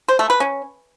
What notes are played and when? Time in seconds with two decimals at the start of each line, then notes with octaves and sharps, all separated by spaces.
0.08 C5
0.19 A3
0.30 B4
0.40 C#4